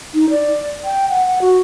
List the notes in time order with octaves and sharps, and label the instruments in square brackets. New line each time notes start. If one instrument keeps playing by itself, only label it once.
[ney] D#4
D5
G5
F#5
F#4